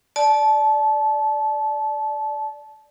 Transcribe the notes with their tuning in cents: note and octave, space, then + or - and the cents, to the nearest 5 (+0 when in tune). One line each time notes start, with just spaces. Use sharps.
D5 +0 A5 -20